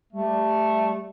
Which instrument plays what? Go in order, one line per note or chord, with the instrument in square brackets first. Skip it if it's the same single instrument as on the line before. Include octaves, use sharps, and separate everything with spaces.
[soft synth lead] G3 [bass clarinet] A3